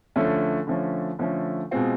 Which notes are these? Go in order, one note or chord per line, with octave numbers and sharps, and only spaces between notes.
D3 F3 A3 C#4
D3 F3 A3 C#4
D3 F3 A3 C#4
B2 G#3 C4 F4